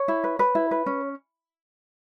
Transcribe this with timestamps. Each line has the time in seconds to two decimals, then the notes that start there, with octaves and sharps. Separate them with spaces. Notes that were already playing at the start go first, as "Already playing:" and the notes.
Already playing: C#5
0.08 E4
0.24 B4
0.39 B4
0.55 E4
0.71 B4
0.86 C#4